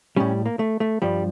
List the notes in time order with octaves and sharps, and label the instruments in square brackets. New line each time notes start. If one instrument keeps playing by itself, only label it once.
[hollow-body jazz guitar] A2 G3 C#4
A#3
A3
A3
G2 F3 G3